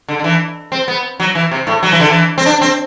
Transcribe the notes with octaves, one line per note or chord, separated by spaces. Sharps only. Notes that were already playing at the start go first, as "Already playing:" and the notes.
D3
D3
E3
C4
B3
F#3
E3
C3
A2
F#3
E3
D3
E3
C4
D4
C4